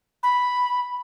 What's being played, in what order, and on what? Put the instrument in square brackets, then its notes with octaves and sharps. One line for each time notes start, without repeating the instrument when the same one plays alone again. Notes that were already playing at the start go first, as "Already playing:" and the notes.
[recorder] B5